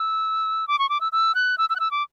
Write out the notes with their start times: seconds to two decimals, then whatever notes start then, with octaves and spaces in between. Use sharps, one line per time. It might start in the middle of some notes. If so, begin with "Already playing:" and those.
Already playing: E6
0.68 D6
0.79 C#6
0.89 D6
1.01 E6
1.12 E6
1.35 F#6
1.58 E6
1.70 E6
1.76 F#6
1.80 E6
1.91 D6